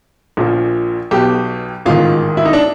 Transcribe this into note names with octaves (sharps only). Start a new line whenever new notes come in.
A#1 A#2 F3
B1 B2 G4
A1 G#2 D#3 F4
E4
D#4
D4